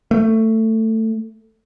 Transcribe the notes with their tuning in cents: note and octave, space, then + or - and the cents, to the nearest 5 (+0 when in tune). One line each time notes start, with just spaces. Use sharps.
A3 +15